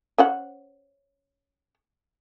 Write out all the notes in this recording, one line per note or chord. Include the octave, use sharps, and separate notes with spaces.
C#4 C5 F#5